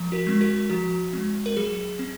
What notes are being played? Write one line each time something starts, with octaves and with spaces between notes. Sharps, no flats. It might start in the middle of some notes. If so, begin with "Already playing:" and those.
Already playing: F3
F#4 A#4
G#3 C4
F#4 A#4
F3 F#4
G#3 C4
A#4
F#3 G#4
C4